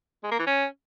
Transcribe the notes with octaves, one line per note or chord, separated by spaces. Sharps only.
G#3
A#3
E3
C#4